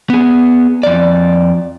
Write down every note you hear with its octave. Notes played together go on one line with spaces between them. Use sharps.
B3 G#4
F2 D5